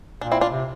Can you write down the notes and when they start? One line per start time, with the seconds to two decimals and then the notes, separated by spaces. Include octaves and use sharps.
0.21 A#2 D4
0.32 C4 E4
0.41 D4 F4
0.51 C3